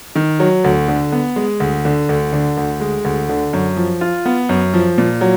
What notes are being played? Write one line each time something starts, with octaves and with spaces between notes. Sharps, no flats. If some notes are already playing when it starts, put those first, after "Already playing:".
D#3
F#3
D2
D3
B3
G#3
D2
D3
D2
D3
D2
G#3
D2
D3
F#2
F3
F4
B3
F#2
F3
A#2
F#3